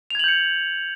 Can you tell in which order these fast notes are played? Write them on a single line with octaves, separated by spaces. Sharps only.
F7 G#6 F#7 G6 C#7